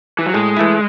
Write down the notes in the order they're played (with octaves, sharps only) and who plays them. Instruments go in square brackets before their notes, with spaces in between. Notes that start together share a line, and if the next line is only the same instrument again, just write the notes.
[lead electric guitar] E3
F#3
[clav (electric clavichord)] A2 [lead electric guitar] G#3
[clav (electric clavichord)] E3 A3 E4